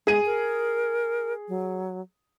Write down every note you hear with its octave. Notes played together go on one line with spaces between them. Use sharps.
G#3 G#4 D#7
A#4
F#3